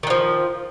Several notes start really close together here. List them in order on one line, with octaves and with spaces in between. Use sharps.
D#3 D3 F3